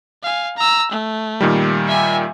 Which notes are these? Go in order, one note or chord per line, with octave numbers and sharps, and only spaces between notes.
F5 G#5
A#5 E6
A3
A#2 D#3 G3
E5 G#5